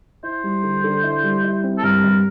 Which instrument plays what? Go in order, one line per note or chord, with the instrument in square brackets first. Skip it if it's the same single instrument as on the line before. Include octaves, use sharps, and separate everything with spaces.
[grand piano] E4 [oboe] C5
[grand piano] G3
D3
D3
E4
G3
E4
C4
[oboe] A4
[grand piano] G2 [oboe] A#4
[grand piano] G2